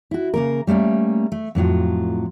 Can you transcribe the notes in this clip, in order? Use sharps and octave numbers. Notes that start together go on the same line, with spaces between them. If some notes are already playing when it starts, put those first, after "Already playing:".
E4 F#4
C#3 A#3 A#4
G3 A3 A#3 C#4
A3
F2 A2 F#3 F4